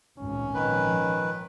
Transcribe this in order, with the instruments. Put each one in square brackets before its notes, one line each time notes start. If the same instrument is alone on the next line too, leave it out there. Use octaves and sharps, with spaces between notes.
[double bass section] G#1 A#2 [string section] C#2 [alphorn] C#4
[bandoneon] D#3 B4 [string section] F3